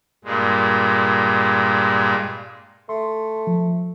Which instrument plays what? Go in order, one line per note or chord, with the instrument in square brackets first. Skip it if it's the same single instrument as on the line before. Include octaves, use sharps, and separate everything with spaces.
[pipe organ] G2 A#2 G#3
[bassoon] A3 [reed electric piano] C6
[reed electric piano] F3